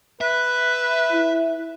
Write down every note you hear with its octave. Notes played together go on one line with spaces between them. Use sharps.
B4 E5
E4